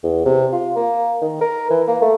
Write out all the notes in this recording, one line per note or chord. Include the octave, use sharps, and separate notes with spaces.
E2
C3
F4
A#3
D#3
A#4
E3
A#3
A3